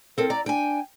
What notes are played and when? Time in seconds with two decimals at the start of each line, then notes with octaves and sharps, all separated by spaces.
0.18 C4 A4 A#4
0.30 D5 A#5
0.46 D4 G5 G#5